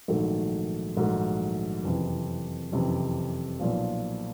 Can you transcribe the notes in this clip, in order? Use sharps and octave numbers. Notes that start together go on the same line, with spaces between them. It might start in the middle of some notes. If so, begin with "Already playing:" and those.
A#1 G#2 D#3 F#3 A3
A#1 G#2 D#3 F#3 A3
F#1 F2 C3 E3
F#1 F2 C3 E3
B1 A#2 F3